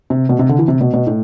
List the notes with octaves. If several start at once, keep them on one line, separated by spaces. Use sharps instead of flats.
C3
B2
C3
D3
E3
C3
B2
B2
A2